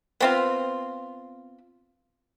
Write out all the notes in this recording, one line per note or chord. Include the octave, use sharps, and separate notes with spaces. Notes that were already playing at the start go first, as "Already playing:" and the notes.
B3 C4 F4